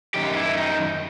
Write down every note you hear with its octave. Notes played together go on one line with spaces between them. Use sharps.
F#2 D#3 G4
E4
D#4